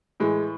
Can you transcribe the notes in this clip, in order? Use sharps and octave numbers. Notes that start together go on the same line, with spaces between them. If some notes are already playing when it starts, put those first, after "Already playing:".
A2 E3 G#3